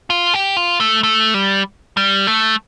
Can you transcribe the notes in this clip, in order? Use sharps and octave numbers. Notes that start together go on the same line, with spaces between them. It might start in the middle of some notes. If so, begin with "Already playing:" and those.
F4
G4
F4
A3
A3
G3
G3
A3